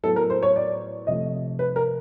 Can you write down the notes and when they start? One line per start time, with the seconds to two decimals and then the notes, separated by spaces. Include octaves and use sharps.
0.03 A2 F#3 B3 A4
0.16 A#4
0.30 C5
0.43 C#5
0.56 D5
1.07 C3 F3 A3 D#5
1.59 B4
1.76 A#4